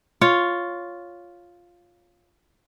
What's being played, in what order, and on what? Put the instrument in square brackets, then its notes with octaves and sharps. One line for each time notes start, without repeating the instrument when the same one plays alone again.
[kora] F4 C#5